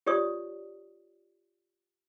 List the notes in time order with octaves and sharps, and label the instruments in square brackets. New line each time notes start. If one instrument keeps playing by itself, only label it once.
[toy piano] F4 G4 C#5 D5 C#6 D#6